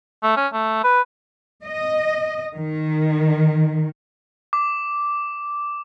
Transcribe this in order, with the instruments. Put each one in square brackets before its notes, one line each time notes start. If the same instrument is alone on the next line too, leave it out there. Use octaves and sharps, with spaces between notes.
[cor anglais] A3
C#4
A3
B4
[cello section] D#5
D#3
[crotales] D6